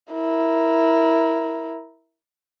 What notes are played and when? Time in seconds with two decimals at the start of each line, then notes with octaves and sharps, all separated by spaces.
0.13 E4 A#4